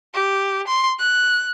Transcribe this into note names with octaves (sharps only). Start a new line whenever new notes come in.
G4
C6
F#6